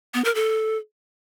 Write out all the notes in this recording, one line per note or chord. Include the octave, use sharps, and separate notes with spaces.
B3
A#4
A4